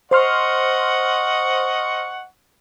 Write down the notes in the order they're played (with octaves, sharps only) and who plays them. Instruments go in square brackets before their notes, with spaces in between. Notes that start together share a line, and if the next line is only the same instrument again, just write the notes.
[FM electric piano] C5 C6 F6 [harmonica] D#5 F#5 C#6